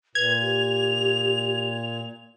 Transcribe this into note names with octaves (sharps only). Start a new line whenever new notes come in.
A#2 B4 G#6 F7
G4